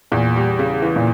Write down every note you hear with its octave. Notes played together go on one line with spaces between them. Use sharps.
E2 A#2
G3
C#3
E3
A#2